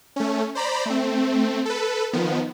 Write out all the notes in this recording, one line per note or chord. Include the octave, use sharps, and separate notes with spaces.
A3 C#4
C5 D5 A#5 B5
A3 C4
A4 B4
D#3 F3 B3